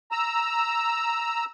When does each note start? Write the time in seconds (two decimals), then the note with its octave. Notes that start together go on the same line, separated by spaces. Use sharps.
0.12 A#5 E6